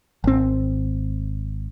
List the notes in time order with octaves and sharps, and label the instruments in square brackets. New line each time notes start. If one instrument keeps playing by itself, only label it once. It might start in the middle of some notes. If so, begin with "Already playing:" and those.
[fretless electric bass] G#1 C4